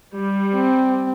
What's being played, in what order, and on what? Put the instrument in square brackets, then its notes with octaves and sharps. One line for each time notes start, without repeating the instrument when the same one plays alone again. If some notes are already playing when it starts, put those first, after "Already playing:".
[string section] G3
[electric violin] C4